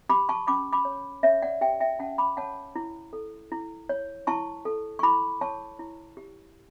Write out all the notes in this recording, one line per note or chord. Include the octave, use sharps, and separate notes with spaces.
G4 B5 D6
A5 C#6
C#4 B5 D6
B5 D6
C#5
C#4 C#5 E5
D5 F#5
G4 E5 G5
E5 G5
C#4 F#5 A5
B5 D6
C#5 F#5 A5
E4
A4
E4
C#5
E4 A5 C#6
A4
C#6
E4 B5 D6
C#5 A5 C#6
E4
G4